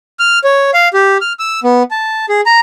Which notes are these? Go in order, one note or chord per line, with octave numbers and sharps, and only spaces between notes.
F6
C#5
F5
G4
F6
E6
B3
A5
G#4
A#5